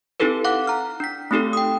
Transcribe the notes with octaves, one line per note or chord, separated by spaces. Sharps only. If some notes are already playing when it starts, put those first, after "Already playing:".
C4 D#4 E4 G4 A4 B4
F5 F#5 D6 F#6
A#5 F6
D4 B6
A3 C4 D#4 G4 A4
G5 D#6